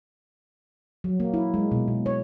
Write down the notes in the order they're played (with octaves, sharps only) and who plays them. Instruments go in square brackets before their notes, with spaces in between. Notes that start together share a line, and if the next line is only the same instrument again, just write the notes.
[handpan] F#3
A#3
E4
G#3
B2
B2
C#5